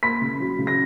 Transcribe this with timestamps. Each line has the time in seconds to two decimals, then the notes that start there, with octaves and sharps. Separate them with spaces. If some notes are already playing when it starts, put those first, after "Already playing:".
0.03 A#3 B5 B6
0.22 C#3
0.40 F#3
0.58 C#3
0.67 A#6